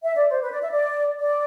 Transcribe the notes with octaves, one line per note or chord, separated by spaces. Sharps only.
E5
D5
C5
B4
D5
E5
D5
D5